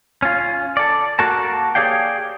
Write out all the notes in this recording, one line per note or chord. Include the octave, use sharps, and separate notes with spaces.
C#4 F4
A4 D5
A#3 F#4 A4 A#4 A5
G4 G#4 C#5 D5 F5 G5